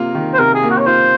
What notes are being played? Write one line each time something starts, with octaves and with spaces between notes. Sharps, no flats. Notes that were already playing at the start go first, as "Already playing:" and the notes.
Already playing: C3 A#3 F4
D#3
C5
C3 A#4
G#4
A#3
F#4
C#5
F4 C5